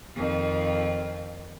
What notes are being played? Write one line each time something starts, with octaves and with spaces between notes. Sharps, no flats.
F2 D#3 F4